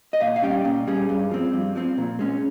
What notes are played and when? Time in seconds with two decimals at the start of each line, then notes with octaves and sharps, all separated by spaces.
0.13 D#5
0.21 A#2 F5
0.36 F5
0.43 G3 C#4 G5
0.65 A#2
0.87 G3 C#4 G#4
1.09 G2
1.31 F3 C4
1.53 G2
1.75 F3 C4
1.98 A#2
2.19 G#3 C#4